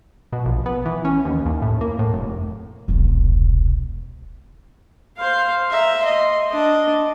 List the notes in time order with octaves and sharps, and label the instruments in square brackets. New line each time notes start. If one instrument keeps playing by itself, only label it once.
[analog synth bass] B2
A#1
B3
E3
C#4
D#2
D#2
A2
A#3
A2
F1
[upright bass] E1 C2
[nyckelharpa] C5 F5
E5 A#5
D#5 C6
D4 D#5